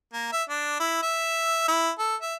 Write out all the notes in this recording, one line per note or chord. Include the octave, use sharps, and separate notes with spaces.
A#3
E5
D4
E4
E5
E4
A4
E5